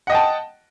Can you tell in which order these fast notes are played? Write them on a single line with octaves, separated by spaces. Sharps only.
F#5 D#5 G5 A5